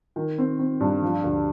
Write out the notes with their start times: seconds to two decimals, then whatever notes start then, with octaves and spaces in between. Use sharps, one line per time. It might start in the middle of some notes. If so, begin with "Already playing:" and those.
0.16 D#3
0.38 C4
0.59 C4
0.80 G2
1.02 F3
1.23 D2